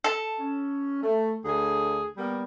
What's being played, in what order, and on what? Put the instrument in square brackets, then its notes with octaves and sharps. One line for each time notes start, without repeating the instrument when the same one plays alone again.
[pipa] A4
[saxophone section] C#4
A3
D2 G#4
G3 A#3 B3